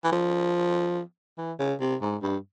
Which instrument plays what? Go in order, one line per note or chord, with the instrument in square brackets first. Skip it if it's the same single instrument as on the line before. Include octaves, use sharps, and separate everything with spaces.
[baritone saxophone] E3
F3
E3
C#3
C3
G#2
G2